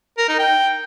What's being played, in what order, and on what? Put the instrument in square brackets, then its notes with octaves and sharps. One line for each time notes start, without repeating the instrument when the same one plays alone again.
[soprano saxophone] A#4
D#4
G5